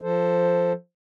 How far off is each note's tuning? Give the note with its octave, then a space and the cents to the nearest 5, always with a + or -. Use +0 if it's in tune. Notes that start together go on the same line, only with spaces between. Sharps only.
F3 +0 A4 +5 C5 +0